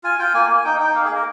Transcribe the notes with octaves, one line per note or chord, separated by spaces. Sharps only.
F4 G#5
F4 G5
A#3 G#5
A#3 G#5
D#4 G5
D#4 G5
A#3 F5
G#4
A#3 A#4